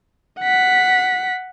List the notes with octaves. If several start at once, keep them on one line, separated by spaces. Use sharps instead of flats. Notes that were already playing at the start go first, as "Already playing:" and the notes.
F#5 B6